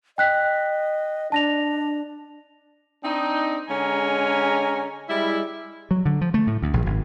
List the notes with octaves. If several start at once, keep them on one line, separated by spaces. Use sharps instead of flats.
D#5 G5 F#6 B6
D4 A5 A#6 F7
C4 D4 D#4
D3 G#3 C#4 G#5 A#5
G3 G#3 E4
F#3
D3
F3
A3
A2
D2
A#1
G#1